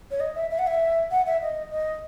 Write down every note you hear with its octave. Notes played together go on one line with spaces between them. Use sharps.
C#5
D#5
E5
E5
F#5
E5
F#5
E5
D#5
D#5